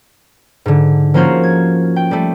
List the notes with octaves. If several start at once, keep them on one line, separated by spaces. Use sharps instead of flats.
G#2 D3
F3 A#3 C#4 F4 F#4 C5
G#6
G5
G3 A3